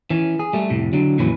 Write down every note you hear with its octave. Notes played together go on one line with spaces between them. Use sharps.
E3 C#4
G#4
G3 A3
F2 A2 C3
D3 F#3
F2 A#2 E3 F#3 C#4 B4